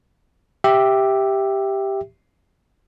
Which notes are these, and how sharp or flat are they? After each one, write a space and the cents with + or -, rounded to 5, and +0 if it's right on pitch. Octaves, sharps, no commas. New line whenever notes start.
G4 +0 E5 +0